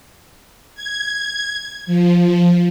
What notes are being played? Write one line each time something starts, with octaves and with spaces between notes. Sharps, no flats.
G#6
F3